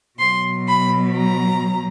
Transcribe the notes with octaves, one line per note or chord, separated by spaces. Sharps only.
B2 F#3 C6
B5
A#5